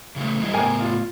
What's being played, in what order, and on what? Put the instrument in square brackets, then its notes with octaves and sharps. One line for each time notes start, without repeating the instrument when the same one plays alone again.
[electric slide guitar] C#3 E3 A3
G3 E4 D#5
[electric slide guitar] A2 B3 [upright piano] A#4 G5 G#5
[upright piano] F4